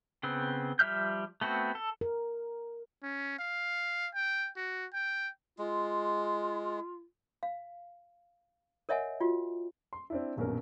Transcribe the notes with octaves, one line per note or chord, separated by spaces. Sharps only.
C#3 B3 C4
F3 G3 E5 F6 G6
A3 B3 C4 F#4
A4
A#4
C#4
F5
G5
F#4
G5
G#3 F4
F5
A#4 C#5 D#5 E5 F#5 G#5
F4 F#4
C6
C4 D4 E4
D#1 A#1 F#2 B2 A#4